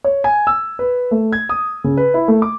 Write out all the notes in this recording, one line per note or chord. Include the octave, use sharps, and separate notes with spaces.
C#5
G#5
E6
B4
A3
G#6
D#6
C#3
B4
E4
A3
D6